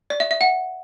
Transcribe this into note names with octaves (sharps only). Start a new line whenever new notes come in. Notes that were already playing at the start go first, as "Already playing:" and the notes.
D5
E5
E5
F#5